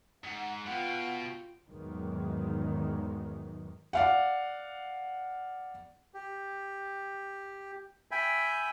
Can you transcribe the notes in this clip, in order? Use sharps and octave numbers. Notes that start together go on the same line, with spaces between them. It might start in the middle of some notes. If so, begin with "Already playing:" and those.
G#2 F#5
B2 F4 G5
E2 G#2 D#3 F#3 G#3
D5 F5 F#5
G4
E5 G5 G#5 B5